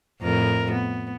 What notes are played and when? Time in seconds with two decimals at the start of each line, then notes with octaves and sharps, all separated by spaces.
0.22 F2 A2 A#4
0.72 B3